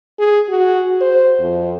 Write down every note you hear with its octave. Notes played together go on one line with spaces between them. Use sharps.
G#4
F#4
C5
F2